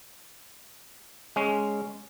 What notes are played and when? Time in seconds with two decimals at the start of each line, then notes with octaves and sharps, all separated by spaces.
1.36 G#3 C#4